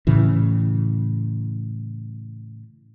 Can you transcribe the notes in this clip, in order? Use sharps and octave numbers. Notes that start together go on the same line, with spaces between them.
A2 C#3 E3